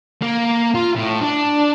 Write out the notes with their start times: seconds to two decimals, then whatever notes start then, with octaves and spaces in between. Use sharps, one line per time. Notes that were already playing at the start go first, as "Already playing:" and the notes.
0.22 A#3
0.75 F4
0.95 A2
1.21 D4